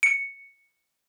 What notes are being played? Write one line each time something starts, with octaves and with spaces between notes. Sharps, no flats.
C#7